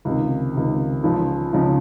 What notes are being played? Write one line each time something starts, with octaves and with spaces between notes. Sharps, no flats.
C#2 C3 D#3
C#2 C3 D#3
C#2 C#3 F3
C#2 C#3 F3